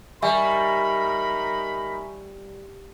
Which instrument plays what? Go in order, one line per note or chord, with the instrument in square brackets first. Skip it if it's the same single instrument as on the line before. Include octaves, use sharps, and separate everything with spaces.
[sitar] G3 [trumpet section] D#4 A#4 B5 [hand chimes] E5 G#5 C#6